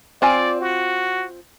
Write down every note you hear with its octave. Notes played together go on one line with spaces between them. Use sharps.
C4 F4 D5 G#5
F#4